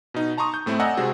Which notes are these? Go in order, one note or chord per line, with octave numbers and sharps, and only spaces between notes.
B2 D#4
A5 A#5 C6 C#6 D#6
G6
A2 A3 C4 E4
D5 D#5 F#5 G#5 A#5 E6
C3 G#3 C4 F#4 G#4